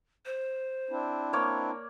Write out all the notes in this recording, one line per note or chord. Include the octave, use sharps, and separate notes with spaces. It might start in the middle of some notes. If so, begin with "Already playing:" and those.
C5
C4 D4 E4
A#3 C#5 D5